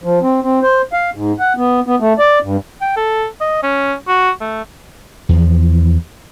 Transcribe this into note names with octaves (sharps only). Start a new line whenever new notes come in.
F3
C4
C4
C5
F5
G#2
F#5
B3
B3
A3
D5
G2
G5
A4
D#5
C#4
F#4
A3
E2 F3